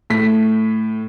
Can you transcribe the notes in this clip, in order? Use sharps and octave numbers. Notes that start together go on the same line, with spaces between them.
A2 B6